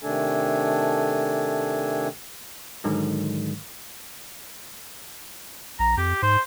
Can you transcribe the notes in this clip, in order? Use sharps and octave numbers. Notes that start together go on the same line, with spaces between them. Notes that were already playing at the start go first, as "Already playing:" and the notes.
C3 D#3 A3 D4 A4 G#5
G#2 D3 D#3 F#3 G#3
A#1 A#5
F2 G4
G#2 C5